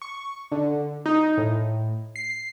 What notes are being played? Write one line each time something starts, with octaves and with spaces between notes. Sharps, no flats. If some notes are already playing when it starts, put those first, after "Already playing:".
C#6
D3
D#4
A2
C7